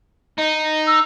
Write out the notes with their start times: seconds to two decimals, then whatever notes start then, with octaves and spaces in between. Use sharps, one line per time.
0.38 D#4
0.87 E6